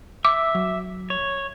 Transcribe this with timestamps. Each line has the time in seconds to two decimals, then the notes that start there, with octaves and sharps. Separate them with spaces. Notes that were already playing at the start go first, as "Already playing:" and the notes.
0.25 E5 D6
0.55 F#3
1.10 C#5